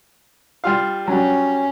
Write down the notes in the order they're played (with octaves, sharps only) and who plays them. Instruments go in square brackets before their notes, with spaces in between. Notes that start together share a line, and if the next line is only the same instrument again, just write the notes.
[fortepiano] G3 F4 F5
[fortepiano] F#3 G3 [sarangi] C#4